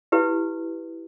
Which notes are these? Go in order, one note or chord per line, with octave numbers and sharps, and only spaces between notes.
E4 G4 B4